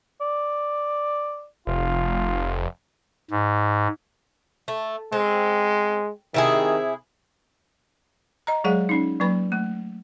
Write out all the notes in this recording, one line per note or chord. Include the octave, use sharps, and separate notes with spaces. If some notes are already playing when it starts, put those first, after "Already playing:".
D5
F1 F4
G#2
A3
G#3 C4
C3 D#3 E4 G#4
D#5 A#5
F#3 G#3 G#4 C#5 F#5
C#4 D#4
F#3 A#3 B4 B5
A3